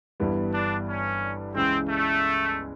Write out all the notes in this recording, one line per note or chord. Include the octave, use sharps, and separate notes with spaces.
G1 G2 E3 G3 B3
D4
C#4
C#2 C#3 E3 G#3 C4
A3